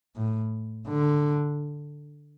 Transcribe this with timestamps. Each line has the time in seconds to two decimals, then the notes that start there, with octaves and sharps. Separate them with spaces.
0.16 A2
0.88 D3